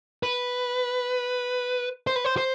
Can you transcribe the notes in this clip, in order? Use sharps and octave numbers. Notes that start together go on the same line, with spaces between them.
B4
C5
B4
C5
C5